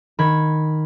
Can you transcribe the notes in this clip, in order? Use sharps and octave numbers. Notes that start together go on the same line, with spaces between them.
D#3 B5 G#6